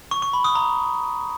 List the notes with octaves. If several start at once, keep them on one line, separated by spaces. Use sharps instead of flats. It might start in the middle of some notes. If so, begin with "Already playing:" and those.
C#6
C#6
B5
D#6
A#5